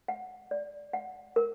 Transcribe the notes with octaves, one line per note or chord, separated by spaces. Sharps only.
F#5
D5
F#5
A#4